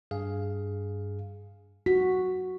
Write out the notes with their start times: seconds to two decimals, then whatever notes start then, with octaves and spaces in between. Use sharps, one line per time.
0.11 G2 G#4 F5
1.86 F#4 B6